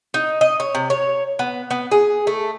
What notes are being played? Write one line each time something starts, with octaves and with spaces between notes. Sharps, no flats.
D#4
D#5
C#5
C3
C#5
B3
B3
G#4
A3